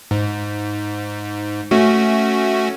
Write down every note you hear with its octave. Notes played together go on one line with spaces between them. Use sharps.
G#2
A3 C#4 F#4